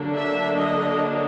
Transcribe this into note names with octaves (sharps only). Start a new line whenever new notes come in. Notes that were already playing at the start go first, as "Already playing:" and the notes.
Already playing: D3 F#3 A#3 D4
E5
D#5